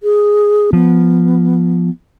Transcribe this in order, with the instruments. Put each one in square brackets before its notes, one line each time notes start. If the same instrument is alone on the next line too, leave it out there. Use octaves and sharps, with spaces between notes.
[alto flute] G#4
[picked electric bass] F3 [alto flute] B3